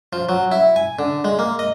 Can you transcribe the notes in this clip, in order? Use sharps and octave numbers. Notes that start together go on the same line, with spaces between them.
F3
F#3
E4
G#5
D3
G#3
A#3
D#5